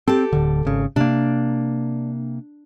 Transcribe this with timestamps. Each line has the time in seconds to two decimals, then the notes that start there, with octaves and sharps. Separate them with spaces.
0.08 C4 G4 A4
0.33 D1 D3
0.65 G#1 C#3
0.96 C3 A#3 D4